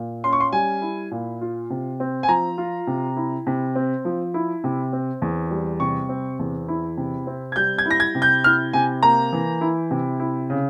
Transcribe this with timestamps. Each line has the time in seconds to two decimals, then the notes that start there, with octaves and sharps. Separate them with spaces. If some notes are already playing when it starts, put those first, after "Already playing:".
Already playing: A#2
0.24 C#4 C6
0.33 C#6
0.40 C6
0.52 G3 G#5
0.82 E4
1.11 A#2
1.41 F4
1.70 C3
2.00 C4
2.23 G#5
2.28 F3 A#5
2.58 F4
2.87 C3
3.17 E4
3.47 C3
3.75 C4
4.05 F3
4.34 E4
4.64 C3
4.93 C4
5.22 E2
5.51 G3
5.80 C3 C#6
6.09 C4
6.39 E2
6.68 E4
6.97 C3
7.27 C4
7.52 G#6
7.56 G3 G6
7.78 G#6
7.86 E4 A#6
8.00 G#6
8.15 C3
8.22 G6
8.44 E4 F6
8.73 C3 G#5
9.03 A#3 A#5
9.33 E3
9.61 E4
9.91 C3
10.20 E4
10.50 C#3